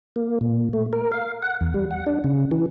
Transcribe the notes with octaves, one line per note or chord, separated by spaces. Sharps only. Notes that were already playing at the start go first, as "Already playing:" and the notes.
A#3
A#2
A3
A#4
F5
F#5
E2
G3
F#5
D4
C#3
E3